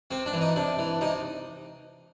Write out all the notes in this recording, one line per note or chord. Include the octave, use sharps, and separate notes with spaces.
C3 C4
D4
E3
D#4
C3 D4
E3
C3 D#4